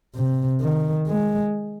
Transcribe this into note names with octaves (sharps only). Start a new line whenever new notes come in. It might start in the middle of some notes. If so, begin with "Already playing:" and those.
C3
D#3
G#3